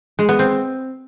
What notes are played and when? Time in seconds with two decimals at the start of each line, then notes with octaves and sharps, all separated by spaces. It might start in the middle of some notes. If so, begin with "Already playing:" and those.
0.19 G#3
0.29 B3
0.39 C4